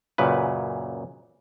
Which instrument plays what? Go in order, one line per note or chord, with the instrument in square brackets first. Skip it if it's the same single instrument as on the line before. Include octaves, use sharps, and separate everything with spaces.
[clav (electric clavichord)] F#2 A#2 C#3 B4